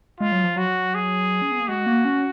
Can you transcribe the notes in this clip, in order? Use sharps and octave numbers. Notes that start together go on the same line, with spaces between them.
G#3 F4
F#3
F3
F#3 F#4
G#4
C#4
B3
A#3
G#3 F#4
A#3
C#4